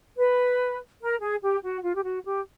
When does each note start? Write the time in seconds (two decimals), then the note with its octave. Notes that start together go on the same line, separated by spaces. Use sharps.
0.18 B4
1.01 A#4
1.21 G#4
1.42 G4
1.63 F#4
1.83 F4
1.95 G4
2.04 F#4
2.25 G4